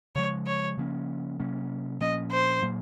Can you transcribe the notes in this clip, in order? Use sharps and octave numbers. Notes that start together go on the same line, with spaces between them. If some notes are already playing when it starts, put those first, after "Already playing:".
C#3 F3 G#3 C#5
C#5
C#3 F3 A#3 C#4
C3 F#3 A#3 C#4
A#2 F3 A#3 C#4 D#5
C5
A#2 F#3 A#3